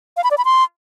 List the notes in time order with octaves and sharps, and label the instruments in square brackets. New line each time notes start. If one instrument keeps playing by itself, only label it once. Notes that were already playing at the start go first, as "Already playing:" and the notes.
[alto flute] F5
B5
D5
B5
C6